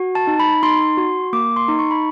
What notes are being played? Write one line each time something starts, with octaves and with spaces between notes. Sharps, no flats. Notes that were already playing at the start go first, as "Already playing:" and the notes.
Already playing: F#4
A5
D#4
B5
D#4 C6
F#4
A#3 D6
C6
D#4
C#6
B5